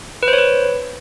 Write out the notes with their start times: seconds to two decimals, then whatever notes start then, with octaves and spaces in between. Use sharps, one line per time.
0.23 B4
0.28 C5
0.33 C#5
0.38 B4